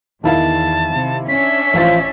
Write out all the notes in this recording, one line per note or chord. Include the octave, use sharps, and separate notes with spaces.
E2 D#3 E4 F5 A5
C3
C#4 D4 E5 B6
A1 F3 F5 A6